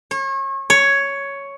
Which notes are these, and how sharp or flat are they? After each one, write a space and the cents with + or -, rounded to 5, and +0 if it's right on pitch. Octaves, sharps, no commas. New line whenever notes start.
C#5 -35
C#5 +5